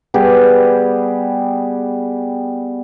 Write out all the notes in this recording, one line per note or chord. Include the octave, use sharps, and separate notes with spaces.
G3 B3 G4 G#4